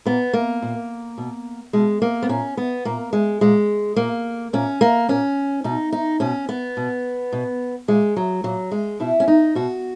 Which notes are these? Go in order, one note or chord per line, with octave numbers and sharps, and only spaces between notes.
A#2 B3
A#3
A#2
B2
B2 G#3
A#3
B3
A#2 C#4
B3
A#2 A#3
G#3
A#2 G#3
A#2 A#3
A#2 C#4
A#3
A#2 C#4
B2 D#4
D#4
B2 C#4
B3
B2
B2
A#2 G#3
F#3
A#2 F#3
G#3
B2 E4
C#4
D#4
B2 F#4